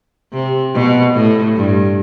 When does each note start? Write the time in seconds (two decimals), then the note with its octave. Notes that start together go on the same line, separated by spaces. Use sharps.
0.33 C3
0.74 B2
1.15 A2
1.56 G2